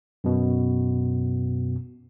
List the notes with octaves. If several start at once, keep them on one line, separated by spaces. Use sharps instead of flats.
F#2 B2